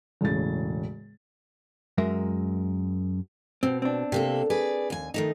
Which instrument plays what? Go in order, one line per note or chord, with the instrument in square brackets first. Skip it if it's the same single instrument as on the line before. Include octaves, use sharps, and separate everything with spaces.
[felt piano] E1 A2 C#3 A6
[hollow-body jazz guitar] F#2 G#3 A#4 E5
[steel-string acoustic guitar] B2 [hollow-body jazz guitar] C4
[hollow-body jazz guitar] C4 D4
[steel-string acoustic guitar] C3 A#3 A4
G#4 B4 D5
D#2 G#5
D#3 A3 D#4